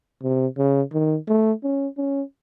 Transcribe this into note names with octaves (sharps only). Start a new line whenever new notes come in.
C3
C#3
D#3
A3
C#4
C#4